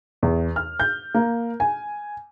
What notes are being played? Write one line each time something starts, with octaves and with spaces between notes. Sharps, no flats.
E2
F6
G6
A#3
G#5